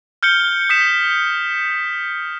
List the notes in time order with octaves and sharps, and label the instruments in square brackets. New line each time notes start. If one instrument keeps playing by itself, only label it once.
[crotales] F6 G6 C#7 G7
D#6 B6 E7